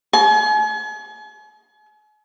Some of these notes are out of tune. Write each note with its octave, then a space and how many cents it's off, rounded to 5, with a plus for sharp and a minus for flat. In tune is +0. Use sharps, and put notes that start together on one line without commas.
G#5 +40